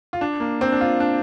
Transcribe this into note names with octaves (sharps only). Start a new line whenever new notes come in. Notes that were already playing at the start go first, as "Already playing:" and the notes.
F4
D4
A#3
C4
D4
F4
D4